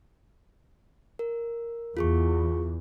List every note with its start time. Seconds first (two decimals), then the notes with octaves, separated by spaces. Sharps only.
1.19 A#4
1.97 E2 F4 G#4 C#6